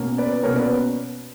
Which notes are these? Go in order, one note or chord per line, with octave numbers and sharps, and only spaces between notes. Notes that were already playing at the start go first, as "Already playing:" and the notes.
Already playing: B2 A#3 C#4
B4 D5
B2 A#3 C#4 A#4 C#5
B4 D5